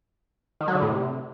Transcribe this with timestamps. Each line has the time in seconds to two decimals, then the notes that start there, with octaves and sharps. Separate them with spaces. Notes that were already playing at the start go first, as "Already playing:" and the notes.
0.61 D#3
0.68 F#3
0.75 D3
0.82 A2
0.89 C3